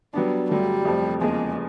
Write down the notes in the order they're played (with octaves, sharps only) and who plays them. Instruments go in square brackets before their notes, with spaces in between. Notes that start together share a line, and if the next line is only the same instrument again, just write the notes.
[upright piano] F#3 B3 D4 [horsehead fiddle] G3
[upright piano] G2 D3 F#3 A3 [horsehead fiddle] G3
[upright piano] F2 C3 F3 A3 C4
[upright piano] E2 C#3 F3 A#3 [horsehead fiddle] G#3